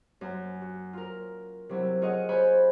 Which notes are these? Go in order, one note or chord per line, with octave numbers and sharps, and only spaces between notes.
F#2
F#4
F4 A#4
C3 F#3 E4
F4 G#4 C#5 D#5 F5 F#5
C5 C#5 G#5 B5 F#6